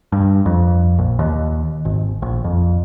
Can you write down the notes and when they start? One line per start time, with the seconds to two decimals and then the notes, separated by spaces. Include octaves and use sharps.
0.12 G2
0.46 F2
0.98 A#1
1.19 D#2
1.85 G#1
2.22 A#1
2.44 F2